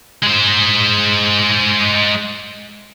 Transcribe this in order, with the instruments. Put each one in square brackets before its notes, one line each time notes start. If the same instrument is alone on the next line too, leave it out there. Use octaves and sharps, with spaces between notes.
[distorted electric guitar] G#3 C5